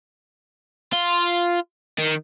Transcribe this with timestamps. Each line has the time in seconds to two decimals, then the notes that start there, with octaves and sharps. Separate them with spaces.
0.93 F4
1.98 D#3